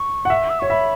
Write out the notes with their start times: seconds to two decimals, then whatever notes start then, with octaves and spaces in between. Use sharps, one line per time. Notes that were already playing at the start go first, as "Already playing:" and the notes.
Already playing: C#6
0.25 F#5
0.30 E5
0.50 E6
0.60 C#5 C#6
0.70 E5 B5